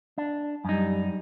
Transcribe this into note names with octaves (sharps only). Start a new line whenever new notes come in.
D4
F#2 G3 D#4